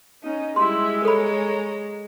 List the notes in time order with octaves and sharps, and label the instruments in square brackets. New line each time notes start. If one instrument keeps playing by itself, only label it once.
[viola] C#4 D#4
[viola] G3 E4 [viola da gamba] G#3 [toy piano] C6
[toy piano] A4 B5 [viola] C#5 A#5